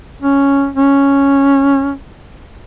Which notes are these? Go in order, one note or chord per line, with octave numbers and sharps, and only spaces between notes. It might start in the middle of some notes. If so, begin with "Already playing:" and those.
C#4
C#4